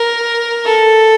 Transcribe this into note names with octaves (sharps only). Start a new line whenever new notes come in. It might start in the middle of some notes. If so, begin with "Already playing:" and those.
Already playing: A#4
A4